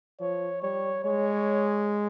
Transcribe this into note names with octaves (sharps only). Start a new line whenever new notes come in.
F3 C#5
G3 C#5
G#3 C#5